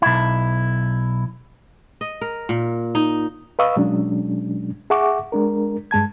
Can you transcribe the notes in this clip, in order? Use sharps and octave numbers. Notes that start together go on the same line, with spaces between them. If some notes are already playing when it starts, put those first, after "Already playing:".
B1 E4
D#5
A#4
A#2
D#4
B4 D#5 F5 C#6 D#6 E6
B2 F#3 G#3 C#4 D4
G#4 E5 F#5 C#6 D6
G#3 D4 A#4
G2 G#3 A5 G#6